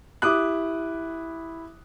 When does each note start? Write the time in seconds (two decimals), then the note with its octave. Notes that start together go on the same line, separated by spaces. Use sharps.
0.22 E4 G4 D6 D#6 F#6